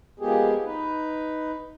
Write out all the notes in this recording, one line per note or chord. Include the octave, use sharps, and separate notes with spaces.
F3 G#3 A#3 B3 G4 G#4
D#4 B4